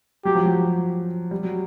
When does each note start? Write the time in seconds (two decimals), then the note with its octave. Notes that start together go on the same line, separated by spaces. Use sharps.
0.25 F#3 G4
0.35 F3
0.46 F#3
1.31 G3
1.43 F#3